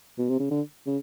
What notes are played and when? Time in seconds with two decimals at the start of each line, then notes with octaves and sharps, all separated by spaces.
0.18 B2
0.29 C3
0.39 C#3
0.50 D3
0.86 C#3